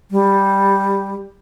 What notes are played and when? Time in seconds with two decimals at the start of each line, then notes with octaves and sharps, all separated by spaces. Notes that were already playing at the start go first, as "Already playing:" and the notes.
0.11 G3